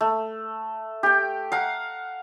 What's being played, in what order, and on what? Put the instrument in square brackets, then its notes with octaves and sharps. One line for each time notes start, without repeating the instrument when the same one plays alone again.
[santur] A3
G4 G5
F5 F#5 A#5